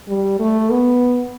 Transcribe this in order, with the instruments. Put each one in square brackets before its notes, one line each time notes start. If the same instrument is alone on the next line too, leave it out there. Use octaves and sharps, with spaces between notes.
[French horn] G3
A3
B3